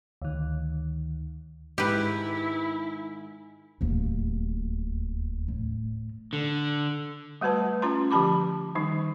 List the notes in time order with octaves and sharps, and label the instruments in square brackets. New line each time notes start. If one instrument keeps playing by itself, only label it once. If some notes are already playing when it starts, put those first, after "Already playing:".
[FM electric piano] D2 D#3
[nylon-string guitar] G#2 D#3 [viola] E4 [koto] G4 B4
[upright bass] D1 D#2
A2
[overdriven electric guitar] D3
[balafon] G3 A3 F#4 B4 A5
C#4 F4 A#5 C6
D3 F3 G4 A5 B5 D6
D#3 G3 D#4